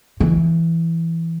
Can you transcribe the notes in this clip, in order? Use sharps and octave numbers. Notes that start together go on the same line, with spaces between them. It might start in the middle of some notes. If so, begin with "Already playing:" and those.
E3